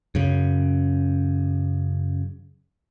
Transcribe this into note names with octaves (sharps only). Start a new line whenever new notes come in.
F#2 C#3